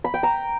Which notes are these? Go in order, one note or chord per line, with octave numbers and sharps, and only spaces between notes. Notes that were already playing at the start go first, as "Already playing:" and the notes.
B5
G5
A#5